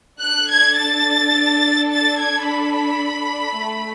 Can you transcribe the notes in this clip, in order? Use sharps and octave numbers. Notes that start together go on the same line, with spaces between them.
D4 A4 F#6
G#6
A6
A6
G#6
B5
A3